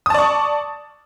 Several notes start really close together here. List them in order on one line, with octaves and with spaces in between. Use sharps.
D#6 A5 D5 C#6